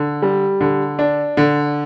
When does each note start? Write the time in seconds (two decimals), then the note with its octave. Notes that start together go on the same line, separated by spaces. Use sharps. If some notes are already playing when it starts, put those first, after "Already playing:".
Already playing: D3
0.22 G3
0.61 D3
0.99 D4
1.37 D3